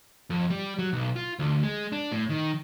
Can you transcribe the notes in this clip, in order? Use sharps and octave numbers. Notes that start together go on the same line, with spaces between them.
F2
G3
F#3
B1
F4
D2
G#3
D4
A2
D#3